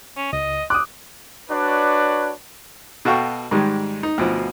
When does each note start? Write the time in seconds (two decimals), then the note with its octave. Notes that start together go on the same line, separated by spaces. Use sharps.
0.17 C#4
0.33 C#2 D#5
0.70 D6 D#6 F#6
1.50 D4 F#4 B4 C#5 D5
3.05 B2 F#4 A4 F5 G5 C#6
3.51 G#2 D#3 G3 G#3
4.03 D#4
4.18 D2 B2 F3